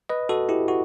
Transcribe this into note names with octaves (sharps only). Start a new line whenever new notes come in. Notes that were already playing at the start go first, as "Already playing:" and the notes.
B4 D#5
F#4 A4
E4 G4
F#4